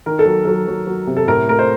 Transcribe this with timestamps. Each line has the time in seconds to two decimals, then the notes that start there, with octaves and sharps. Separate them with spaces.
0.06 D#3 A#4
0.19 A4
0.25 F#3
0.45 F#3 A4
0.67 F#3
0.87 F#3
1.07 C3
1.17 A4
1.27 A2 A#4
1.48 A3 A#4
1.59 C5